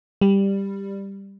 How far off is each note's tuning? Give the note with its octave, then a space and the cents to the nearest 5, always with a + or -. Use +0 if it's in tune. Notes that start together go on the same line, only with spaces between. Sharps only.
G3 +10